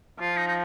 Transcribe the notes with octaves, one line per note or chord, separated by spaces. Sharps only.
F3 F4
D#4
D#4